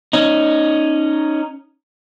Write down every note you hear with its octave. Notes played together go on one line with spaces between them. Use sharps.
C#4 D#4